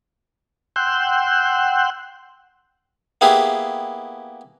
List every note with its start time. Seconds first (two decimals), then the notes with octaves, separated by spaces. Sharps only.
0.76 F#5 G5 C6 E6 F#6 G6
3.21 A#3 B3 E4 G4 G#4